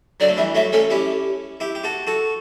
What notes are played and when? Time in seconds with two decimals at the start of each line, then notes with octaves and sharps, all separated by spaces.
0.20 D3 F#3 D5
0.28 A3
0.37 E3 G3 E5
0.55 F#3 A3 E5
0.72 A3 C#4 A4
0.90 C#4 E4 G4
1.60 E4 G4
1.75 G4
1.84 F#4 A4
2.07 F#4 A4